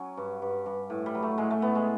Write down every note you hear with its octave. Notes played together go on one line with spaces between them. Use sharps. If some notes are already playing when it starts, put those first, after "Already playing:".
Already playing: F#3 C#4
G2
G2
G2
A2
G3
F#3
A3
A2 G#3
A3
A2 B3
G#3